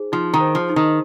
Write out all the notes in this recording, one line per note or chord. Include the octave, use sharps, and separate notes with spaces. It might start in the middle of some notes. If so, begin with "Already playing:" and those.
Already playing: D#4 G#4 C5
F3 D#4
D#3
C5
F3
D#4
D#3